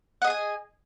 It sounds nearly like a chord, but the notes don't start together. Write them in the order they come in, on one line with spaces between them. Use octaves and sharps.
F#5 D#5 G#4 G#5